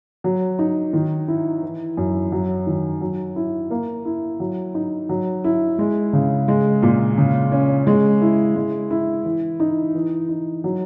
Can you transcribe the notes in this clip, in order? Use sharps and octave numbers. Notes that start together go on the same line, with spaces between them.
F#3
D#4
D#3
E4
E3
F#2
F#3
D#3
F#3
E4
A#3
E4
F#3
D#4
F#3
E4
G#3
C#3
G#3
A#2
C#3
C#4
G#3
E4
G#3
E4
E3
D#4
E3
D#4
F#3